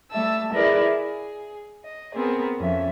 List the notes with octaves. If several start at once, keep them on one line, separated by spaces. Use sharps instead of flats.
G3 A3 E5 A5 E6
E4 G#4 A#4 B4 D5 E5
G#4
D#5
B3 C4 G#4 A#4
F2 C#4 E5